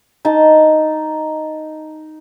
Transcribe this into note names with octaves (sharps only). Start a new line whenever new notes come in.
D#4 A5